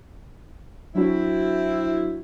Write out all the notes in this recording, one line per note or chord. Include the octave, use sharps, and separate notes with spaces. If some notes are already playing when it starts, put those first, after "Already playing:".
F#3 C4 D4 E4 F#4